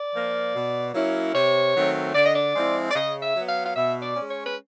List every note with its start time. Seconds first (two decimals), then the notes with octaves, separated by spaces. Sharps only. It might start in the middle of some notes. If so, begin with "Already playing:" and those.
Already playing: D5
0.13 F3 A#3
0.54 B2
0.94 F#3 A#3 C#4 E4
1.34 C3 C#5
1.75 D#3 F#3 A3 C4
2.14 D3 D5
2.25 D#5
2.36 D5
2.55 F3 G#3 C4 E4
2.91 D5
2.95 C#3 D#5
3.23 E5
3.36 F#3 B3
3.49 F5
3.66 F5
3.75 B2 E5
4.02 D5
4.16 G#3 C#4
4.30 C#5
4.46 B4